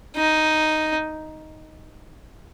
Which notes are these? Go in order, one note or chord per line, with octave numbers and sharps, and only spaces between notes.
D#4